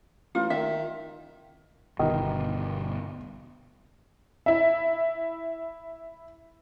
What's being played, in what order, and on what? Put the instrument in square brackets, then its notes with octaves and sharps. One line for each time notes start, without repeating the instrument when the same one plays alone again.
[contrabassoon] A1 [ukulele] F4
[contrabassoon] D#3 [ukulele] E5
[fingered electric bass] G1 B2 [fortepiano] D#3
[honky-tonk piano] E4 E5